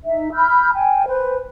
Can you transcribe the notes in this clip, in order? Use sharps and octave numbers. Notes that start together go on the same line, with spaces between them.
D#4 E5
B5 E6 F6 G6
G5 G#5
B4 C5